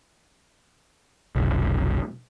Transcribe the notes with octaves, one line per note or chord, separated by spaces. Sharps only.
F1 B1